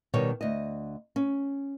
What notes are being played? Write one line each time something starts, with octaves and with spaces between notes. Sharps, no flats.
B2 D#3 G3 C#5
D2 D#5
C#4